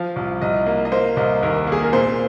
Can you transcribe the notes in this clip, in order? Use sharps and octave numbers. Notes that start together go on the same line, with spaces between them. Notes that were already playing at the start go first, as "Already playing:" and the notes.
Already playing: F3 F5
C2
C2 D#5
A#3
D#5
A#3 C5
C2 D#5
D#2 A#4
A#3 G#4
A#4
A#2 C5